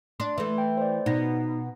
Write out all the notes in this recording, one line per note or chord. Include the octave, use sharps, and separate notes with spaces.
D4 C6
E3 A3
G5
C5 D5
B2 D#4 A#6